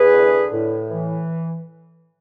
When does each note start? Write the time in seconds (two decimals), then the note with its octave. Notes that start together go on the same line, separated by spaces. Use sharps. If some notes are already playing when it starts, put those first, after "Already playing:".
Already playing: E2 G#4 B4
0.13 D3
0.52 A2
0.90 E3